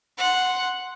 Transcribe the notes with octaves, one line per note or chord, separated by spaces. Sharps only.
F#5 C6